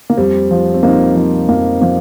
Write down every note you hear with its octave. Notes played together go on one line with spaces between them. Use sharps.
A#3
F2 G3 C4
F3
C4
F2 A#3 D#4
F3
F2 A#3
F3 A#3